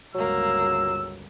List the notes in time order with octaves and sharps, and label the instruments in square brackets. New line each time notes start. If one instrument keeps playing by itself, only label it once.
[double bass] G1 C#2 [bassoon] F#3 [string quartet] G#3 A#3 [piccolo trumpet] E6